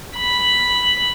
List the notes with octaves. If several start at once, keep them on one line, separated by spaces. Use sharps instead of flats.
B5